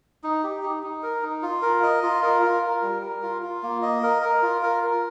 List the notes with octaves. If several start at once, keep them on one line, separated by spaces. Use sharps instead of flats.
D#4
G4
D#4
D#4
A#4
D#4
F4
A#4
D#5
F4
A#4
F4
A#4
G3
A#4
F4
F4
A#3
D#5
A#4
A#4
F4
A#4
A#4